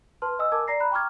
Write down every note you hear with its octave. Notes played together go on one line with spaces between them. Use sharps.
B4 A5 C6 F6
D#5 G#5 D#6 E6
A#4 G#5 A5 D6 E6 G#6
D5 A#5 A#6 C7
A#5 B5 F#6
G5 A#5 C#6 D6 F6 G#6